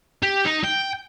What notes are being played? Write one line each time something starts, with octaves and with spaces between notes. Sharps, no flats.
G4
D#4
G5